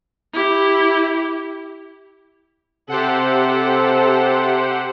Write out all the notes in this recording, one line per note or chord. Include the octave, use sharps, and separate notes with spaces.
E4 G4
C3 G4 A4 C5 F#5